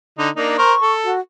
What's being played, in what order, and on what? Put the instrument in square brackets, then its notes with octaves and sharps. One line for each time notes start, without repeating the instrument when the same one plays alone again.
[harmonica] D3 D#4
A#3 D4 D#4
[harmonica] A#4 C5 [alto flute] C#6
[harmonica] A4
[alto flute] F#4